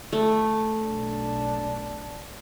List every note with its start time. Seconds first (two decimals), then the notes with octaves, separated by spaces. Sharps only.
0.12 A3
0.82 B1 D4